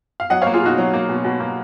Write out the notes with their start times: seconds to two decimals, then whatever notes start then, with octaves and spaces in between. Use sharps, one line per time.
0.20 F5
0.30 F#3 D#5 F#5
0.42 A#3 C#5 F5
0.54 F4 G#4
0.62 B2 D#4 F#4
0.78 F#3
0.93 A#3
1.09 B2
1.24 B2
1.40 A#3